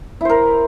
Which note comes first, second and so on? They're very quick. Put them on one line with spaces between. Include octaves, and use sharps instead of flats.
E4 C5 A#4